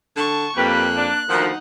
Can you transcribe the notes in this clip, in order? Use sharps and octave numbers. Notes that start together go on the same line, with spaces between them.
D3 A5 C#6
F2 G3 A#3 G4 B4 F#6
D4
D2 D#3 F3 D#4 F#5